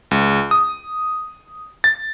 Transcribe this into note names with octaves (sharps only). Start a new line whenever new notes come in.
C#2
D#6
A6